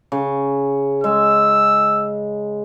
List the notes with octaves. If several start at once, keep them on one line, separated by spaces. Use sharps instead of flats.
C#3
G#3 E6